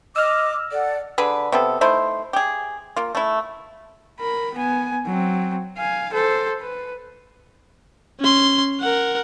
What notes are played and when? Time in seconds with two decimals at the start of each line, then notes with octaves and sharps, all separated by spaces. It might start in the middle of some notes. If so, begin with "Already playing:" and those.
0.16 D#5 D6 E6 F6
0.71 A4 D5 F#5
1.18 D3 G#4 B4
1.52 C3 B3 A4
1.81 A3 D#4 E4 C5
2.33 G4 G#4
2.96 A#3 F4
3.15 A3 E4
4.20 A#4 B5
4.54 B3 G#5
5.06 F#3 C4
5.77 F5 G#5
6.13 A4 C5
6.61 B4
8.20 C#4 C6
8.80 A#4 F#5